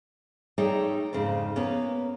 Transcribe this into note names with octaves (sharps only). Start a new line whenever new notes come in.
G3 A3 D#4 G#4 C#5 G5
F2 G#2 C#3
A#3 B3 C#4